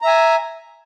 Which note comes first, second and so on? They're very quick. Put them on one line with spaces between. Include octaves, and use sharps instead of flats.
A#5 E5 G#5